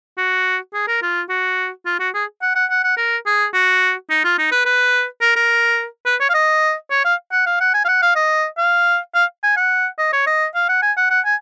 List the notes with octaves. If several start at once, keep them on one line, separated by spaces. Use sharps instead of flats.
F#4
G#4
A#4
F4
F#4
F4
F#4
G#4
F#5
F#5
F#5
F#5
A#4
G#4
F#4
D#4
F4
D#4
B4
B4
A#4
A#4
B4
C#5
F5
D#5
C#5
F5
F#5
F5
F#5
G#5
F5
F#5
F5
D#5
F5
F5
G#5
F#5
D#5
C#5
D#5
F5
F#5
G#5
F#5
F#5
G#5